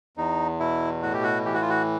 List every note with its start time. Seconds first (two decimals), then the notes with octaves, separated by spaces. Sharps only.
0.17 E2 D#4
0.60 B2 E4
1.02 A2 F#4
1.13 G4
1.23 F#4
1.45 E3 G4
1.54 F#4
1.62 F4
1.70 F#4